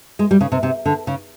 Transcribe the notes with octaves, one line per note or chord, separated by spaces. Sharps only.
G#3
G3
C#3
C3
C3
D3
C#3